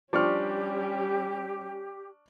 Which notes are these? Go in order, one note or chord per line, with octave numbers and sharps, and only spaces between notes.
F3 G3 C#4 D4 G4 C#6 F6